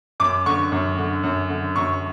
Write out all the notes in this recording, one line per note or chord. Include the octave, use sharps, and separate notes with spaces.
F#2 D6
D3 C#6
F#2
D3
F#2
D3
F#2 C#6